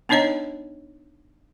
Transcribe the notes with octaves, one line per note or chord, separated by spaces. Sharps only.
B3 D4 D#4 C#5 D#5 A#5